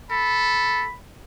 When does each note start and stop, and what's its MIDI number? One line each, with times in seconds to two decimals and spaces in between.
0.11 0.85 69
0.11 0.94 83